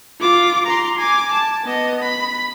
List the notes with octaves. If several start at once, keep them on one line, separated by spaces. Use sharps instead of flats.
F4 D6
A#5 C6
G#5 D6
A5
B3 D#5
B5